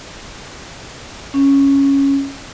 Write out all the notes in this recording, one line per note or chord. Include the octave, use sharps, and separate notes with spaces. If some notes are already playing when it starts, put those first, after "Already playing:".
C#4